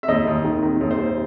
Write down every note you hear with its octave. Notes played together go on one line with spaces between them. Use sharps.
E5
D#2 D#5
D#2
D#3
D#3
D#2
C5
D#2